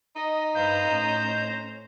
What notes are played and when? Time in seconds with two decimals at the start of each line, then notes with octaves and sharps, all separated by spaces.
0.16 D#4 D#5
0.55 G2 B4 C5 F5 A#5 G6
0.86 A2 C#4